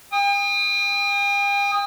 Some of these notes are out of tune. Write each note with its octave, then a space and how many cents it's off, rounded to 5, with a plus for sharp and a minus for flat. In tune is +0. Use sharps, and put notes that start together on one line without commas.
G5 +45 D#6 +0